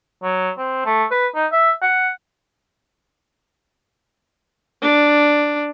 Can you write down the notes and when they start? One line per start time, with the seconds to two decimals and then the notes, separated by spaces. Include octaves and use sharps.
0.23 F#3
0.58 C4
0.86 A3
1.11 B4
1.35 D#4
1.52 E5
1.82 F#5
4.82 D4